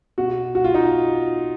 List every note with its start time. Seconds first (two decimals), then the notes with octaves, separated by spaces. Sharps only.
0.18 B2 F#4
0.55 F#4
0.64 F4
0.74 D#4